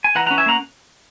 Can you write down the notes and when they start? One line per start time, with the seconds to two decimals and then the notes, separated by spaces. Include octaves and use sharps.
0.04 G#5
0.15 E3 F#5 A#5
0.26 C#4 F#5 A#5
0.38 E5 G#5
0.46 A#3 F#5 A#5